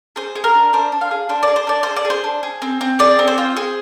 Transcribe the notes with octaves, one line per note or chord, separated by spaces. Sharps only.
G#4 C5
G#4
A#4
D4
D4 C5
D4
F5
G#4
D4 C5
D5
G#4
C5
D4 D5
G#4 C5
D5
G#4
C5
D4
G#4
C4
C4
G#4 D5
C4
C5
F4
G#4